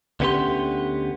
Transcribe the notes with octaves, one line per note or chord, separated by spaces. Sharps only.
D2 D3 B3 C#4 G4 C6